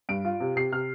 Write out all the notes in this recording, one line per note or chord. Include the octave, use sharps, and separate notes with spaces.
G2 D7
F4
C3
C3 C7
C3 F6